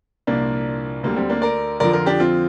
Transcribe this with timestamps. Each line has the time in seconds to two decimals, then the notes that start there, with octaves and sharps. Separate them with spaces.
0.27 C2 A#2 F3 A#3 D4
1.03 D2 D3 G3 A#3
1.16 G3 C4
1.30 A#3 D4
1.42 A#4 D5
1.80 F2 D3 F3 A#4 D5
1.93 F4 A#4
2.06 D4 G4
2.20 C4 F4